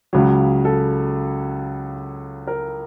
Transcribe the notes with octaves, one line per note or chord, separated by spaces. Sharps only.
C#2 C#3 F#3
A4
A#4